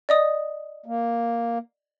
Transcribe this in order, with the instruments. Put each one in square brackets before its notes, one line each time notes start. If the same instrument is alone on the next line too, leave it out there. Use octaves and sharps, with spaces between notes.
[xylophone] D5 D#5 D#6
[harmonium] A#3